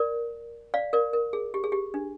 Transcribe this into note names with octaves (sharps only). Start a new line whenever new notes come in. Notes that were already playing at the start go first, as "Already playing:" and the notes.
Already playing: A#4 D5
D5 F5
A#4 D5
A#4
G#4
G4
G#4
G4
D4